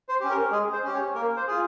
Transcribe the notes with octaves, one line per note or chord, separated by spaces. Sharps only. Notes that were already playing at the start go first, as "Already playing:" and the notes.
C5
C#4 G4
A#4
G#3 G#4
C5
C#4 G4
C#5
A#3 A#4
C5
F4 G#4